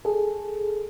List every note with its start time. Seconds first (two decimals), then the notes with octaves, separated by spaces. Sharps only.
0.05 G#4 A4